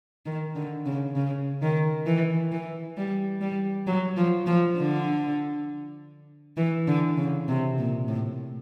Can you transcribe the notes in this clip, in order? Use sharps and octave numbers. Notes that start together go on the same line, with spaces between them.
D#3
D3
C#3
C#3
D#3
E3
E3
G3
G3
F#3
F3
F3
D3
E3
D3
C#3
C3
A#2
A2